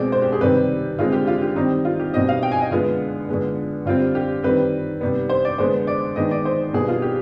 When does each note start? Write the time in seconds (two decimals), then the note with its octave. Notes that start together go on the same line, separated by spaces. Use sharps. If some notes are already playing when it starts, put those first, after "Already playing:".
Already playing: B2 G#3 C4 D5
0.12 C5
0.22 G4
0.32 G#4
0.41 C3 D#3 G3 C4 B4
0.99 D3 G#3 C4 F4
1.12 G4
1.27 F4
1.42 G4
1.56 D#3 G3 C4 D#4
1.85 F4
2.00 G4
2.14 B2 G3 C4 D#5
2.29 F5
2.43 G5
2.52 G#5
2.61 D#5
2.71 D3 G#3 B3 F4
3.29 D3 G#3 B3
3.86 D3 G3 C4 F4
4.15 G4
4.43 D#3 G3 C4 B4
5.01 C3 G3 B3
5.29 C5
5.45 D5
5.58 D3 G#3 B3 C5
5.87 D5
6.16 D#3 G#3 B3 D#5
6.31 D5
6.45 C5
6.73 B2 G3 B3 G#4
6.88 F4
7.02 G4